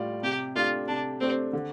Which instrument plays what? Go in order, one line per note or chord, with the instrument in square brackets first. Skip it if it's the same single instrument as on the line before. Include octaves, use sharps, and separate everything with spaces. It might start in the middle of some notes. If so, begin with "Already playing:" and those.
Already playing: [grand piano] A2 G3 F4 D5
[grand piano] C3 [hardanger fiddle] G4
[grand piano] A3 D4 G4 [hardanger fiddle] F4
[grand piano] C3 [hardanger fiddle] D4
[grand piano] A3 D4 G4 [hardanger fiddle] C4
[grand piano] D3